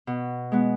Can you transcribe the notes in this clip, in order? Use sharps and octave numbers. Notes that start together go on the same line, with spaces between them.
B2
G#3 B3